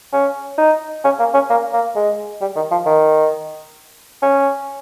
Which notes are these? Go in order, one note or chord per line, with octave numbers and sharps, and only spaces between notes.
C#4
D#4
C#4
A#3
C#4
A#3
A#3
G#3
G3
D#3
F3
D#3
C#4